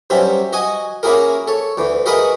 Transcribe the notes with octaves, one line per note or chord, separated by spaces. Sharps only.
G2 F#3 C4 C#4 E5
F#4 D#5 G#5
A#3 C#4 E4 F#4 G#4 A#4
A4 C#5
D2 E3
F#4 G#4 A#4 B4 D#5 F#5